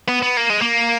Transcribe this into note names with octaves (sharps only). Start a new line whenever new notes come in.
B3
B3
A#3
G#3
A#3